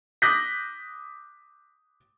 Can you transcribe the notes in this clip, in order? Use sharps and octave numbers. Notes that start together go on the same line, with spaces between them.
D6 D#6 F#6 G6 A#6 B6